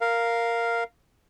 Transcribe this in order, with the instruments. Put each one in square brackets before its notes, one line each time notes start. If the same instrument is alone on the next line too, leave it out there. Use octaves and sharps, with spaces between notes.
[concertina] A#4 F5